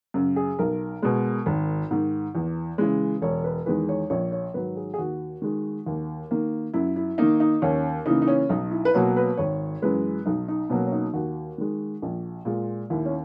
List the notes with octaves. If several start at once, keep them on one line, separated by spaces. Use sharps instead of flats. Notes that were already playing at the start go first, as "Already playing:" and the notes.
F#2 C#3
G#4
B1 A#4
B2 G#3
G#1
G#2 D#3
E2
C#3 E3 G#3
E1 C#5
B4
E2 D#3 G#3 B4
C#5
A#1 C#5
C#5
G#2 D#3 F#3 B4
G#4
G#4
D#2 F#4
D#3 G#3
D#2
D#3 A#3
F#2 E4
E4
D#3 A#3 D#4
D#4
D#2 C#4
C#3 E3 A#3 D#4
D#4
C#4
B1 D#4
E4
B4
B2 F#3 A#3 C#5
B4
G#1 C#5
F#2 E3 G#3 B4
B1 D#4
D#4
B2 F#3 A#3 C#4
C#4
D#4
D#2 F#4
D#3 G#3
A#1
A#2 G#3
D#2 E4
C#4